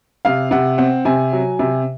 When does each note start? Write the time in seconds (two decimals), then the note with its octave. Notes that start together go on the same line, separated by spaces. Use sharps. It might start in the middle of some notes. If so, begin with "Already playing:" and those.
0.25 C3 F5
0.51 C3 F#5
0.78 C4 F#5
1.05 C3 G#5
1.33 F#3
1.59 C3